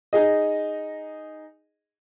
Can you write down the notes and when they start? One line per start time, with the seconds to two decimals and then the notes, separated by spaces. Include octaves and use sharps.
0.13 D#4 G#4 D#5